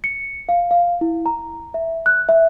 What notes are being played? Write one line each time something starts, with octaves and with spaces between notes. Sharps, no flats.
C#7
F5
F5
E4
A#5
E5
F#6
E5